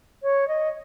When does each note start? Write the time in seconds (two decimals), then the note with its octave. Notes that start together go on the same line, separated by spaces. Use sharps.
0.23 C#5
0.48 D#5